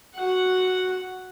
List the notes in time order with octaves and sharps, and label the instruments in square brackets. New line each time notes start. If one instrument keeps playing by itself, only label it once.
[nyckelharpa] F#4 F#5